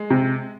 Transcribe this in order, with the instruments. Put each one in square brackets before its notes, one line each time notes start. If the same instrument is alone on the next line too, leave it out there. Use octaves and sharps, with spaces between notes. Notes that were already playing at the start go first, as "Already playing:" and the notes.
Already playing: [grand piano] G#3
[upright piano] C3